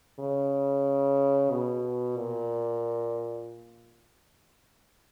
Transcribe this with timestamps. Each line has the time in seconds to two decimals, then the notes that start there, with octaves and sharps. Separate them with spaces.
0.20 C#3
1.51 B2
2.17 A#2